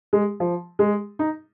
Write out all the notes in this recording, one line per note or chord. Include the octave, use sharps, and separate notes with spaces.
G#3
F3
G#3
D#4